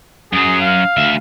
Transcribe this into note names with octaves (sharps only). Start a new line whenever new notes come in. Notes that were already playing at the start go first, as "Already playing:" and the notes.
F#2 F#3 G#4
F5
D2 E5